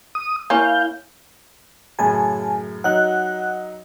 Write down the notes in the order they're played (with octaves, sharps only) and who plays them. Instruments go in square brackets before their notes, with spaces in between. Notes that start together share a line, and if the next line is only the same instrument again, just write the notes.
[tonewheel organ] D#6
[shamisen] A#3 C#4 [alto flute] E4 [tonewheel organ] F5 G6
[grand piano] F#2 A2 C#3 [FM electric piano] G#5 A5
[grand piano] F#3 D#4 [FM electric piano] F#5 F#6